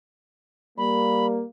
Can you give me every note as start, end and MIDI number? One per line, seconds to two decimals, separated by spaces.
0.78 1.43 55
0.78 1.43 58
0.78 1.26 83